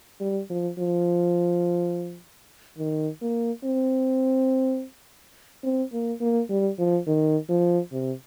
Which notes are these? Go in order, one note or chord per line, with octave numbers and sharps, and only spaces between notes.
G3
F3
F3
D#3
A#3
C4
C4
A#3
A#3
G3
F3
D#3
F3
C3